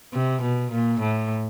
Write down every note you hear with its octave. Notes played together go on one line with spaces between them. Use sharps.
C3
B2
A#2
A2